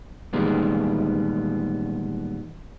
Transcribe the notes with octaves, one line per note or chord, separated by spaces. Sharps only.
A#2 D#3 E3 G3 G#3 B3